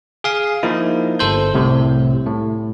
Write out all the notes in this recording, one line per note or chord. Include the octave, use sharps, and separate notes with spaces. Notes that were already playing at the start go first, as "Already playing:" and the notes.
G#4 F5 D#6
F3 A#3 D#4 E4
G1 A4 C5 G6
C2 A2 C3
A2